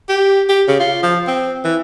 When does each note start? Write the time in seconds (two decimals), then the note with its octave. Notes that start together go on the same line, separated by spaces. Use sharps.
0.09 G4
0.49 G4
0.67 C#3
0.79 F4
1.03 F3
1.27 C4
1.64 E3